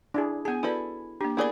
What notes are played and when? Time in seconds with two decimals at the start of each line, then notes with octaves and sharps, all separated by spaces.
0.14 D4 E4 G#4
0.45 B3 G#4 G#5 A5
0.63 E4 F#4 A4 B4 D5 B5
1.21 A#3 D4 G4
1.37 B3 E4 G#4 A#4 D5 B5